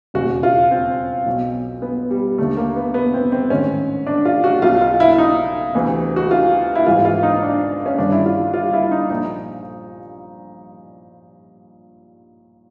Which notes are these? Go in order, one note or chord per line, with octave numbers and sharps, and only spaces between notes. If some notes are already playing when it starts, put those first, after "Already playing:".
E1 D#2 C#3 F#4
F4
C4
B1 B2
B3
G3
D#2 D3 A3
A#3
B3
B3
C4
C4
A1 G#2 D#3 C#4
D4
F4
F#4
B1 B2 F4
F4
E4
D#4
D2 C3 E3
F#4
F4
E4
G#1 G#2 E3 F4
F4
D#4
D4
C#4
G1 G2 D#3 D4
E4
F4
F4
E4
D#4
A#1 A#2 D#4